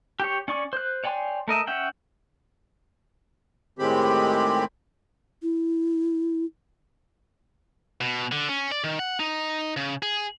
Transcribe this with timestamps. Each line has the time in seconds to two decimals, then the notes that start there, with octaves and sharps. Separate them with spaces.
0.20 G4 C#5
0.48 C#4 D5 C#6
0.73 C5 F#6
1.04 C#5 D5 G5 G#5 C6
1.48 A3 A#4 D#5 E5
1.67 C#4 E5 F#5 G5
3.79 A2 D#3 G#3 C4 G4 B5
5.42 E4
8.01 B2
8.32 D3
8.49 C#4
8.72 D5
8.84 D#3
8.99 F#5
9.20 D#4
9.77 C#3
10.02 G#4